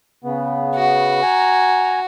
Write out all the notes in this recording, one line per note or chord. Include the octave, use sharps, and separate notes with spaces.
C#3 B3
F#4
G#5 A#5